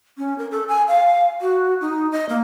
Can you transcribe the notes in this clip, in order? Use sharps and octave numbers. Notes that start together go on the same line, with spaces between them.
C#4
A#4
A4
G#5
F5
F#4
D#4
D#5
A#3